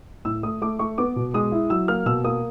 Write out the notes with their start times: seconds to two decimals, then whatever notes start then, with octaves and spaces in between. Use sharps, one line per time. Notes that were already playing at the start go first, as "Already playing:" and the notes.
0.25 A2 E6
0.43 A3 D#6
0.62 A3 D6
0.79 A3 C#6
0.98 B3 D6
1.16 B2
1.34 G#3 D#6
1.52 E4
1.70 F#3 E6
1.88 A#3 F6
2.06 B2 E6
2.24 A#3 D#6